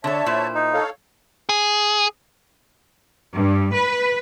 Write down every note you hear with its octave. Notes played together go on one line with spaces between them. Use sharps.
D3 A4 C#5 E5 A5
A#2 E4 C5
D#4
A4 C#5 F5
G#4
G2
B4